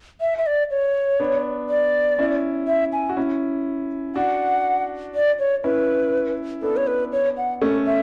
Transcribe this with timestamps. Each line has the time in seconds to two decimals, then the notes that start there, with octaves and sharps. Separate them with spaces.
0.21 E5
0.38 E5
0.46 D5
0.70 C#5
1.20 B3 D4
1.69 D5
2.19 C#4 E4
2.67 E5
2.93 G#5
3.09 F#4
3.17 C#4 E4
4.15 D4 F#4 F#5
5.15 D5
5.39 C#5
5.64 C#4 E4 B4
6.62 B3 D4 A4
6.77 C#5
6.87 B4
7.12 C#5
7.37 F#5
7.61 A3 C#4 A4
7.86 E5